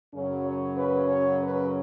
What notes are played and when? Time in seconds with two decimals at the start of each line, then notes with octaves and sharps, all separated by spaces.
0.14 F#2 C#3 F#3 C#4
0.46 C#5
0.78 B4
1.09 C#5
1.40 B4